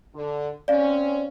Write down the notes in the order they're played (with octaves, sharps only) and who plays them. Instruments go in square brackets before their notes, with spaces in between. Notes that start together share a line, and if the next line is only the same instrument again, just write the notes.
[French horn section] D3
[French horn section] C4 C#4 [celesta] D5 F5